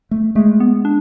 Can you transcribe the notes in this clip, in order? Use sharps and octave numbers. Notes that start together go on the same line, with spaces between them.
A3
G#3 A3
B3
D4